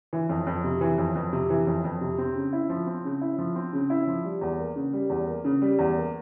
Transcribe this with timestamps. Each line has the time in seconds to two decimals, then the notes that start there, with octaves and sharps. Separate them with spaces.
0.13 E3
0.29 F2
0.47 F2
0.64 C3
0.81 E3
0.98 F2
1.16 F2
1.33 C3
1.50 E3
1.67 F2
1.84 F2
2.01 C3
2.18 C4
2.36 C#3
2.53 E4
2.70 F3
2.87 C4
3.04 C#3
3.21 E4
3.39 F3
3.56 C4
3.73 C#3
3.90 E4
4.07 F3
4.24 G3
4.41 E2
4.58 A#3
4.76 C#3
4.93 G3
5.10 E2
5.27 A#3
5.45 C#3
5.62 G3
5.79 E2
5.96 A#3